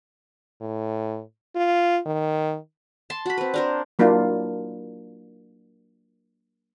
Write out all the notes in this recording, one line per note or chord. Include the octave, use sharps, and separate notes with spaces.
A2
F4
D#3
A5 C6
F#4 B5
C4 B4
D4 A#4 C5
F#3 A#3 D4 E4 F4